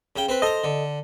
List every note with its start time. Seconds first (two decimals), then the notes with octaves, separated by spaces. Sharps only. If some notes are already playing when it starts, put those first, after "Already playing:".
0.16 C#3 G5
0.29 C4 B4
0.42 A4 C5 D#5 A#5
0.64 D3